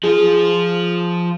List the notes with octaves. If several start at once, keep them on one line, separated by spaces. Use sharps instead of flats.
F3 F4 G#4